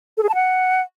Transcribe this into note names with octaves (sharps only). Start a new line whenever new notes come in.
A4
G#4
A5
F#5